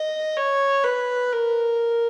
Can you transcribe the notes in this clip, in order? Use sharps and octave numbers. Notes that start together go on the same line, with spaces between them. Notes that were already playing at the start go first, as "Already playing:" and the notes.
Already playing: D#5
C#5
B4
A#4